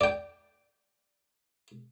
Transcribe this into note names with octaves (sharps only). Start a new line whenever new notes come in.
D5 G5